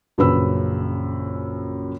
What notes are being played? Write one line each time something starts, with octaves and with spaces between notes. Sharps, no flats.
A#1 F#2 C#3 B4 B5 E6